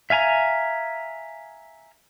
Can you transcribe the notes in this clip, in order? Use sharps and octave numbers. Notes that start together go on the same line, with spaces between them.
E5 F5 G#5 A#5